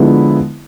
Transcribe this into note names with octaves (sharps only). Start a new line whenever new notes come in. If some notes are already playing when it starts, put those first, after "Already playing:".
Already playing: D3 F3 G#3 B3 E4